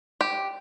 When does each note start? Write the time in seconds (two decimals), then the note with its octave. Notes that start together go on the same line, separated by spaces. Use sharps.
0.21 G4